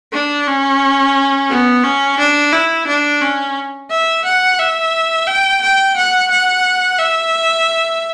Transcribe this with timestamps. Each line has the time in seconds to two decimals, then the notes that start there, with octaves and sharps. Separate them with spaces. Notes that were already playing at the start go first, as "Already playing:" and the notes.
0.12 D4
0.47 C#4
1.50 B3
1.84 C#4
2.19 D4
2.53 E4
2.87 D4
3.21 C#4
3.91 E5
4.25 F#5
4.59 E5
5.27 G5
5.62 G5
5.96 F#5
6.31 F#5
6.99 E5